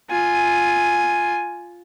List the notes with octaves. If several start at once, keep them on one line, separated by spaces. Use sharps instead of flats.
F4 G#5